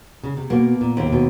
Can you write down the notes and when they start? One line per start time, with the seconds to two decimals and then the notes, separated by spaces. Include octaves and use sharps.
0.24 C#3
0.37 C3
0.50 B2 A#3
0.81 A#2
0.97 D#2
1.06 C3
1.13 B2